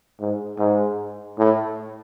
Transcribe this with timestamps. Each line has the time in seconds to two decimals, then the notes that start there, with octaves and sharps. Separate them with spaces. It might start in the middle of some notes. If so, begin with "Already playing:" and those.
0.20 G#2
0.59 G#2
1.38 A2